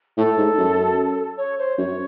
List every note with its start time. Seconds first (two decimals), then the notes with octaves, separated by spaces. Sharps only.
0.17 A2 A4
0.38 G#2
0.58 F#2
1.38 C#5
1.58 C5
1.78 F#2 C#5